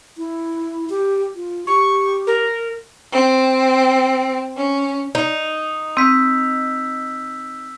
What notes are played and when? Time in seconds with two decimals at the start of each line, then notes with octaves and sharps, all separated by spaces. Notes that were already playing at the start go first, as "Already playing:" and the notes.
0.18 E4
0.90 G4
1.35 F4
1.67 G4 C#6
2.27 A#4
3.11 C4
4.56 C#4
5.15 D#4
5.97 C4 E6 G6 B6